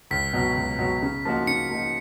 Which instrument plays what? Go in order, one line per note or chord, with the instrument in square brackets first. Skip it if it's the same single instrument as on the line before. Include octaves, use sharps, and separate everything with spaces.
[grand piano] C#2 [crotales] B6
[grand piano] B2 F#3
C#2
B2 F#3
C#3
F3 A#3 D#4 F#4
[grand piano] C#3 [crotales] C#7
[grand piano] F3 A#3 D#4 F#4